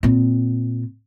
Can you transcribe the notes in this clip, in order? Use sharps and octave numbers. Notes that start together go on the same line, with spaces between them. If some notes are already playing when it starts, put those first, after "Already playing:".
A#2 C4